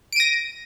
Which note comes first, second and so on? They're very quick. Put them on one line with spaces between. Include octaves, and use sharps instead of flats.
D7 D#7 A#6